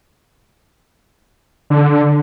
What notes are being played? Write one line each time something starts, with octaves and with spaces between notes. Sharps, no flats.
D3